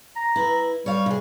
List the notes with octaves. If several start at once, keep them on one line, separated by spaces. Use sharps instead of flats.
A#5
E4 B4
G3 C#5 F5
C3 G#4